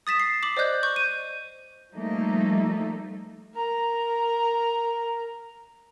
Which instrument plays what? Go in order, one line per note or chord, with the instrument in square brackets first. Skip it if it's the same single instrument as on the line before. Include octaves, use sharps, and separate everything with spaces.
[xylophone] D#6 A6 B6 E7
C7
D6 F#7
C5 D5 D#5 F#6 G6
C#6 G6
D#7
[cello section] F3 G3 A3 A#3 D#4
[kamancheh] A#4 A#5